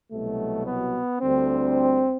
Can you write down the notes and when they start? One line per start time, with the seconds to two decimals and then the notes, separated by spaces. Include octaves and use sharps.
0.12 C2 B2 F#3 A3
0.67 B3
1.21 D2 D3 G3 C4